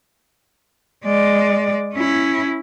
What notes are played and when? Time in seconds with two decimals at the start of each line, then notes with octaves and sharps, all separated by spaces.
1.04 G#3 D5
1.94 C#4 E4